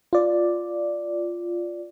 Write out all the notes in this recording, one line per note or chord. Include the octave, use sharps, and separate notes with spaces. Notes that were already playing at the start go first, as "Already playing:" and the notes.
F4 D5